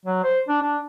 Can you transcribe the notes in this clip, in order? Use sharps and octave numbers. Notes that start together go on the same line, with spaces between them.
F#3
C5
D4
D4